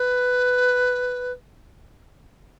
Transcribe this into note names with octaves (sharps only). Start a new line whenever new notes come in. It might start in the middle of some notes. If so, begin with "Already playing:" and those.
Already playing: B4